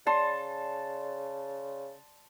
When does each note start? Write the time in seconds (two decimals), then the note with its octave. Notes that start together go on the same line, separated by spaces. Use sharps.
0.07 C#3 D5 A5 C6